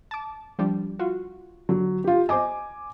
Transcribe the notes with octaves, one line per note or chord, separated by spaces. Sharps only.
A5 D6
F3 G3 D4
F4 F#4
D3 F#3
F4 G4
C5 D#5 G#5 D6